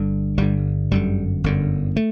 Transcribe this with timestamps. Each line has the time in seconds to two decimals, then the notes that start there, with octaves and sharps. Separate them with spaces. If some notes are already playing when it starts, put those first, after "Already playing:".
Already playing: G1 G2 D3
0.37 G1 G2 D3 G3
0.91 G1 F#2 D3 G3
1.44 G1 F#2 D3
1.96 A3